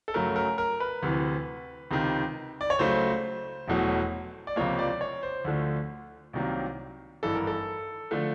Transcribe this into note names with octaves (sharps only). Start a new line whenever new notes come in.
A4
F#2 C#3 F#3 A3 A#4
A#4
A#4
B4
D2 C3 E3
C#2 C3 D#3
D5
C#5
C#2 C#3 F#3 A3 C5
E1 E2 B2 F#3 A3
D5
C#2 C3 F3 A#3 C#5
D5
C#5
C5
D2 D3 F3 A3
C2 C3 D#3 F#3 A#3
G#1 G2 E3 A4
A#4
A4
D3 F3 A3